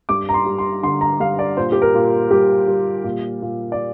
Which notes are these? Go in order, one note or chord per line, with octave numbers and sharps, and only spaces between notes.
G2 D6
A#5
C6
G3
C6
D3 C6
A#5
G2 F5
D5
A#2 C5
G4
A#4
A#2
G3 G4
G3
A#2
A#2
D5